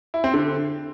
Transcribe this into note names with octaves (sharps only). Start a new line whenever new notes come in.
E4
C4
D3